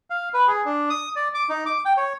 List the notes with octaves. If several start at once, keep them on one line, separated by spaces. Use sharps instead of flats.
F5
B4
G#4
D4
D#6
D5
D6
D#4
D6
G5
C#5